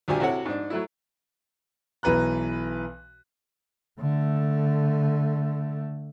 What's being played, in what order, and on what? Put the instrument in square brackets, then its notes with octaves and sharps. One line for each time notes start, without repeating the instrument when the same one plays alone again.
[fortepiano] D2 A#2 D4 G4 G#5
C3 E4 F#4 A4 C#5 F#5
G#2 D4
F#3 A3 E4
[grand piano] B1 E3 B4 A#5 F#6
[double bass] D3 A3